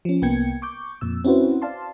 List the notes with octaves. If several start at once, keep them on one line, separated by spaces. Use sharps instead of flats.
F3 C#4
C2 A#3 B3 G5 G#6 C#7
C#6 D6 G6
F2 A#2 E6
C4 C#4 E4 F#4 B4 C5
D5 F5 A5 C6